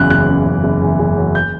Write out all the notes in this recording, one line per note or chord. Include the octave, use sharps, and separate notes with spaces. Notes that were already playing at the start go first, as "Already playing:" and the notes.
Already playing: F#1 E2 C#3 F#3 F#6
F#1 F#6
C#3
F#1
F#1
E2
F#1
F#3
G6